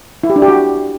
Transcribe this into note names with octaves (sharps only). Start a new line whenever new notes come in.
E4
G4
D4
G4
F#4